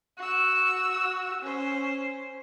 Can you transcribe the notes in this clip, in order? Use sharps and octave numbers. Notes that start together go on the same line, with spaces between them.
F#4 E6
C#4 C5